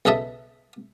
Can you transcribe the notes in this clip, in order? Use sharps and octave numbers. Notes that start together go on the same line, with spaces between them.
B1 C#3 A4 D#5 E5